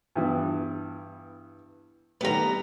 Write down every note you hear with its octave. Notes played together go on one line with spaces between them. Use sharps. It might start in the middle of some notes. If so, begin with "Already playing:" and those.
G2 E3 B3
D#3 G3 A3 B3 A#5